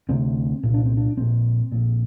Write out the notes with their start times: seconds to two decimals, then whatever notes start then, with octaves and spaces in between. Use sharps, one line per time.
0.09 D2 C3 C4
0.63 C2 A#2
0.74 D4
0.86 C4
0.97 D4
1.17 A#1 A#2 C4
1.72 A#1 A#2